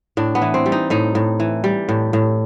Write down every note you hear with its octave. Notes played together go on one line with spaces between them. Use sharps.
A2 D4
B3
E3
C4
G3
D#4
A2 D#4
A2
E3
G3
A2
A2